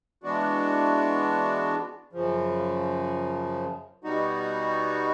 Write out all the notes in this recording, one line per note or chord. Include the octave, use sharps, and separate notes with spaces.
E3 G#3 B3 D4 F#4
F#2 C#3 F3
B2 G3 B3 D#4 F#4